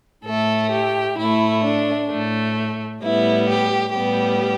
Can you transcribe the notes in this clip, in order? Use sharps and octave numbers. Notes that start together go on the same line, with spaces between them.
A2 A3 A4
G4
A2 A3 E4
D4
A2 A3
A2 G3 B3 E4
G4
A2 G3 B3 G4